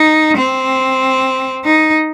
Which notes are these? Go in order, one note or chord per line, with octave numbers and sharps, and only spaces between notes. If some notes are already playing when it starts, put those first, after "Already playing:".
Already playing: D#4
C4
D#4